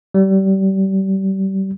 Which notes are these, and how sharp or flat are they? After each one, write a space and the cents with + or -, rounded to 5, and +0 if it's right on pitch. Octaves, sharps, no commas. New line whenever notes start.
G3 -30